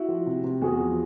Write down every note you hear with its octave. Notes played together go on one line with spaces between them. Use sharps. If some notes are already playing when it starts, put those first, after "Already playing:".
Already playing: E4 F#4
F3
C3
C3
E2 F#4 G#4
F3